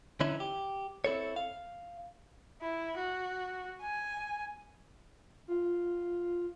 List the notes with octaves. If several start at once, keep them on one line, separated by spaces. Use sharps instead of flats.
D3 E3 C#4 D#4 E4
G4
C4 E4 A4 C#5
F5
E4
F#4
G#5
F4